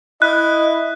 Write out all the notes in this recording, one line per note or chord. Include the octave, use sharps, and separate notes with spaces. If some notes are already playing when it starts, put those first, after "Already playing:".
E4 D#5 F#6